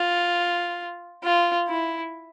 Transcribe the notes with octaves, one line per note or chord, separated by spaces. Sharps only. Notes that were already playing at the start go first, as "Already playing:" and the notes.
Already playing: F4
F4
E4